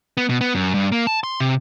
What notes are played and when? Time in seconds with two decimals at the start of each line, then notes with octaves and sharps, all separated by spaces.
0.17 B3
0.29 B2
0.41 B3
0.55 F#2
0.74 G2
0.92 A#3
1.07 A5
1.24 C6
1.40 C3